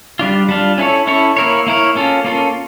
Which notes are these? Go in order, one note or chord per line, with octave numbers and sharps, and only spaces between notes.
G3 D4 F4
G3 D4 F4
C#4 E4 A4 C#5
C#4 E4 A4 C#5
A#3 E4 A#4 C#5
A#3 E4 A#4 C#5
A#3 C#4 F4 A4
A#3 C#4 F4 A4